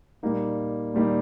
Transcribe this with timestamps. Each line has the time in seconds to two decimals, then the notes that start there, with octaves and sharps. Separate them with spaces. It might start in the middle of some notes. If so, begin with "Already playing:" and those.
0.23 A#2 G3 A#3 D#4
0.94 A#2 G3 A#3 D#4